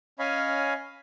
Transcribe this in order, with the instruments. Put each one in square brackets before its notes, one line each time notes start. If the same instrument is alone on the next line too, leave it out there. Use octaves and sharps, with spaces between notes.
[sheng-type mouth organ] C#4 C#5 D#5 F5 G#5 B5